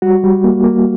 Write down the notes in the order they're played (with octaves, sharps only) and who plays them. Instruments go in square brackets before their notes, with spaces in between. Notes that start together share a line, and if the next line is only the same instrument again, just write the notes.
[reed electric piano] G3 F#4
G3
A#3
A#3